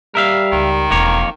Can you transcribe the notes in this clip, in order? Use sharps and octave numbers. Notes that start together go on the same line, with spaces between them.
G3 A#4 E5 F5
C#2 D#3
E1 F2 A#3 C#5